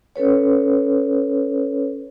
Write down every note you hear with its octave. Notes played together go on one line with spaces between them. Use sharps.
C#4 A4 B4 C#5